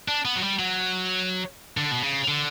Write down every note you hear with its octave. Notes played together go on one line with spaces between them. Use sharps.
D4
B3
F#3
G3
F#3
D3
B2
C#3
D3